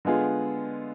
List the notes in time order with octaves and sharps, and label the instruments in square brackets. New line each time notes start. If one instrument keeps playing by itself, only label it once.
[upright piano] D3 G#3 B3 F4 G#4